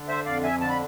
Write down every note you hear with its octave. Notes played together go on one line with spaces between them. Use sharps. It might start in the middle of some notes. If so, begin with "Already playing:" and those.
Already playing: D3
C5 E5
F2 D5 F5
E5 G#5
D3 A5
B5